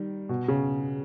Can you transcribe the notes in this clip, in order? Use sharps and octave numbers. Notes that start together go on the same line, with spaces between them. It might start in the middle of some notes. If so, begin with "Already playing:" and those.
Already playing: D#3 G3
B2
C#3